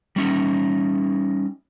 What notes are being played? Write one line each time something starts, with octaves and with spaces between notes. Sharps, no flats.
G3 C#4 D#4